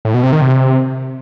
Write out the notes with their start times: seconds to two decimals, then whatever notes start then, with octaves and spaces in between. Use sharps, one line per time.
0.05 A2
0.14 B2
0.23 C3
0.32 D#3
0.42 C3